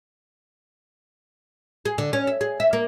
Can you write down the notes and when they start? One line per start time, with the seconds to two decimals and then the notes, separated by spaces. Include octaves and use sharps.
1.85 G#4
1.98 D3
2.13 C#4
2.27 E5
2.41 G#4
2.60 E5
2.73 A#3